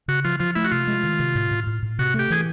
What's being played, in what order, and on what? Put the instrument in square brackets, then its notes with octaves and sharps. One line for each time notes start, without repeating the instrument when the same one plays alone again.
[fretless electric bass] C#3 [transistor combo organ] F#4
[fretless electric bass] F3 [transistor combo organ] F4
[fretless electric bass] F3 [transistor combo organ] F4
[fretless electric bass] A3 [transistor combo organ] E4
[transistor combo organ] F#4
[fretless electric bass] C3 [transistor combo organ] F4
[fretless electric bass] G#3
D#3
C3
A2
A2
A2
A2
[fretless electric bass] C3 [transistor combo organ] F#4
[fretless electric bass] A3 [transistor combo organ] G4
[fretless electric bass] E3 [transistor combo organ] G#4